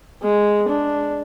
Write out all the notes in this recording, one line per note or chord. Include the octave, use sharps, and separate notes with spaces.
G#3
D4